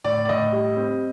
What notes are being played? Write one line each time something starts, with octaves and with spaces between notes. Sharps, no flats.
A2 D5
D5
A2 D#5
G3
C4